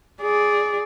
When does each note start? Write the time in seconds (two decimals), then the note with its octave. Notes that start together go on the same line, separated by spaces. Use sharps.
0.21 G#4 D5